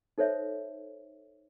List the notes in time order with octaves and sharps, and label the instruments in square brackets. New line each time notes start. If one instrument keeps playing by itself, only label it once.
[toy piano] D#4 A4 C5 C#5 E5